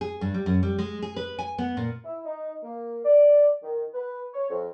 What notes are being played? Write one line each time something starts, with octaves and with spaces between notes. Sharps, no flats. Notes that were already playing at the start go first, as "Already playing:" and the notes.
G#4
G2
G3
F#2
G3
G#3
G#4
B4
G#5
B3
A#2
E4
D#4
A#3
D5
D#3
B4
C#5
F2